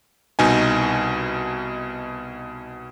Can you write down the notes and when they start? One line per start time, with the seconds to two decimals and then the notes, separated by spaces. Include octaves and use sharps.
0.39 C2 B2 D#4 G#5